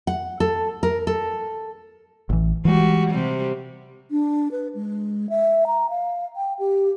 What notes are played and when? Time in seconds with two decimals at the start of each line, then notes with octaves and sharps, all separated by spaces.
0.07 F#5
0.40 A4
0.83 A#4
1.07 A4
2.30 A1 E3
2.65 E3 G3 G#3 F#4
3.10 C3 G3
4.11 D4
4.52 B4
4.75 G#3
5.30 E5
5.67 A#5
5.90 F5
6.36 G5
6.59 G4